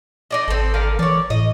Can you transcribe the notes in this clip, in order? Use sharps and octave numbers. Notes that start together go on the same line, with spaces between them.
D#4 D5 D#5
G#1 C4 A4
D3 A#4 F5
E3 C#5 D5
A2 D#5